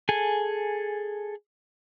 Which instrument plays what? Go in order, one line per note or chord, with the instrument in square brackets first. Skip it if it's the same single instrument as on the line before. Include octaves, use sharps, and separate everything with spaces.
[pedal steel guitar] G#4 A4 G#5